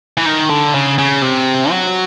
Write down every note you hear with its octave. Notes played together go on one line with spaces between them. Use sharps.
E3
D#3
D3
C#3
C#3
C3
F#3